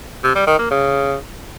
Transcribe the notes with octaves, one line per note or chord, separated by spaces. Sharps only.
C3
G3
D#3
A#3
C#3